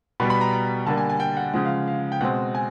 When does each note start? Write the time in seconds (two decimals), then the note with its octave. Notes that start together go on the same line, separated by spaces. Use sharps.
0.20 B2 G3 B3 B5
0.30 B5
0.41 A#5
0.53 A#5
0.86 D3 G3 A#3 A5
0.97 G#5
1.09 G#5
1.20 G5
1.37 F#5
1.53 C#3 F3 G#3 F#5
1.65 F5
1.88 F5
2.12 G5
2.21 B2 G#3 C4 F#5
2.55 G#5